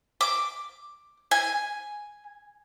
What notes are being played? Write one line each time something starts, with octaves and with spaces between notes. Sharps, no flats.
D6
G#5